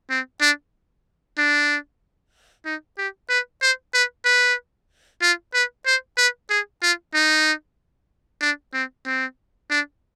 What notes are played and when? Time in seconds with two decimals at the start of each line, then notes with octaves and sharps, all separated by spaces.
0.10 C4
0.41 D4
1.38 D4
2.66 D#4
2.98 G4
3.29 B4
3.62 C5
3.94 B4
4.25 B4
5.22 F4
5.54 B4
5.86 C5
6.17 B4
6.50 G#4
6.82 F4
7.14 D#4
8.41 D4
8.73 C4
9.06 C4
9.71 D4